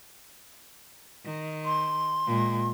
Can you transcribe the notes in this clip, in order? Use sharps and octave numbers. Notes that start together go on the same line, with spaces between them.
D#3
C6
A#2 G#3